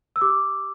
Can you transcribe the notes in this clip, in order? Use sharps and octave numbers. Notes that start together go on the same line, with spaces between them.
E6
G4 D6